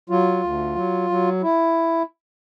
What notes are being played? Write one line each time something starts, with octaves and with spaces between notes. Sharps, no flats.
F#3 F4
D2
F#3
F#3
E4